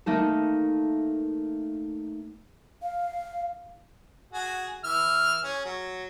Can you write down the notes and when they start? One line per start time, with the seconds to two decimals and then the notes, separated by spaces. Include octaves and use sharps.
0.06 A3 A#3 D#4 A4
2.83 F5
4.33 F#4 G#4
4.84 E3 E5 F6
5.43 C#4 G#4
5.65 F#3